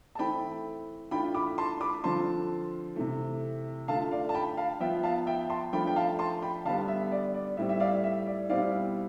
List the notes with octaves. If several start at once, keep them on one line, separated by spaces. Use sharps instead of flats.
A5
E3 A3 C4 G5 B5
E3 A3 D4 F4 G5 B5
B5 D6
A5 C6
B5 D6
D3 F3 C4 F4 A5 C6
C3 E3 A3
D3 A3 D4 F4 F5 A5
D5 F5
A5
G5 B5
F5 A5
F3 B3 F4 E5 G5
F5 A5
E5 G5
A5 C6
F3 A3 D4 F4 G5 B5
G5
F5 A5
A5 C6
G5 B5
D3 G3 B3 F5 A5
E5
D5
D5
A2 G3 C4 E5
E5
D5 F5
E5
D5
B2 G3 C4 E4 D5 F5